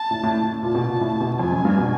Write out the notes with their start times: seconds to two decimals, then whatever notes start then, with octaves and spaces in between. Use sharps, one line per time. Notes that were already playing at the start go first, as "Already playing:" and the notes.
Already playing: A5
0.11 A2
0.23 A2
0.43 A2
0.61 A#2 A5
0.75 B2
0.87 A#2
1.01 A2
1.20 B2
1.39 F2 G#5
1.52 F#2
1.65 G2
1.78 B2